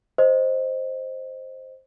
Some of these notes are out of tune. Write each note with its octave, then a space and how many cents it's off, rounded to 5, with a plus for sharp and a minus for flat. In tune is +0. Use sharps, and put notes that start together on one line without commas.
C5 +5 D#5 +0